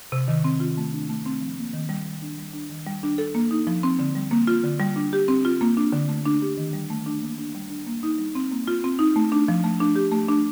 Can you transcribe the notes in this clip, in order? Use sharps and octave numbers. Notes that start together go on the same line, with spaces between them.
C3
D#3
C4
F4
A3
D4
A3
C4
F3
A#3
D#3
G3
G3
D4
G3
D4
D#3
G3
D4
A4
A#3
D#4
F3
C4
D3
G3
A#3
F4
D3
G3
D4
G4
C4
F4
A#3
D4
D3
A3
D4
G4
D#3
G3
A3
D4
A#3
D4
G3
D4
A#3
D#4
G3
C4
A#3
F4
C4
D#4
A3
D4
F3
A3
D4
G4
A3
D4